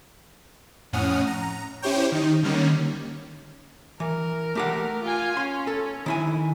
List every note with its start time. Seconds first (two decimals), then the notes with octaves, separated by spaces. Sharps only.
0.93 F2 A2 C#4 F#5 D#6 F6
1.27 A#5
1.82 C#4 E4 G4 C5 C#5 G5
2.12 D#3 D#4
2.43 D3 D#3 G3 A#3 C#4
4.00 E3 A#4
4.55 A3 G4 F#5
5.03 F4 G#5
5.37 C#4 C6
5.67 A4
6.06 D#3 E4 G#5